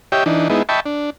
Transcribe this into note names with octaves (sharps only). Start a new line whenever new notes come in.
G4 C#5 D#5 E5 G5
E3 D4 D#4
G#3 B3 D#4 E4
D#5 E5 G5 A5 B5 C#6
D4